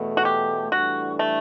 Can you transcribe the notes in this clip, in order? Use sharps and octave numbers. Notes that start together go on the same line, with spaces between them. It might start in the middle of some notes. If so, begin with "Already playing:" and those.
Already playing: E2 B2 A3
F#4
G4
A2 E3 G3 D4 F#4 A4
A3